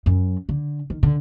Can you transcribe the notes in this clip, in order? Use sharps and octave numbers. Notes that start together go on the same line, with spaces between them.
F#2
D3
D#3
D3